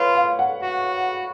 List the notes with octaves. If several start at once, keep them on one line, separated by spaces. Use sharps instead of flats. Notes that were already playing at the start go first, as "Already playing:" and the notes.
Already playing: F4 B4 C#5
F5
F#5
F#4